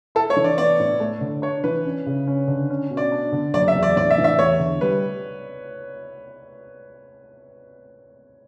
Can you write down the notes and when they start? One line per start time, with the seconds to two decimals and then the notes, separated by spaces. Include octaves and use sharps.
0.15 E4 A4
0.30 C#5
0.37 E3
0.44 D5
0.58 B3 D5
0.80 A2
1.00 A3
1.21 D3
1.42 D4 C#5
1.64 E3 B4
1.85 C#4
2.06 C#3
2.27 C#4
2.48 D3
2.70 C#4
2.91 B2
2.97 D5
3.12 D4
3.32 D3
3.54 F#1 D5
3.68 E5
3.75 E2
3.83 D5
3.96 A2 D5
4.10 E5
4.18 E3
4.24 E5
4.39 E2 C#5
4.59 D3
4.81 G3 B4